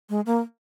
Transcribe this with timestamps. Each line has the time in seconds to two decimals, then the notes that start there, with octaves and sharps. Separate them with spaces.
0.10 G#3
0.26 A#3